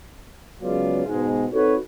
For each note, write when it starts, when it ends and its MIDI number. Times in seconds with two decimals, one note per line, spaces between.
0.63 1.01 49
0.63 1.01 54
0.63 1.01 56
0.63 1.01 59
0.63 1.01 65
0.63 1.01 74
1.07 1.45 44
1.07 1.45 47
1.07 1.45 56
1.53 1.77 60
1.53 1.77 63
1.53 1.77 66
1.53 1.77 69
1.53 1.77 71
1.53 1.77 73